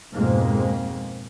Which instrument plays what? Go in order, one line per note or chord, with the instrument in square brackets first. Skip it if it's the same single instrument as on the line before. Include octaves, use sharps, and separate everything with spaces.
[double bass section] F2 G#2 B2 G#3 A#3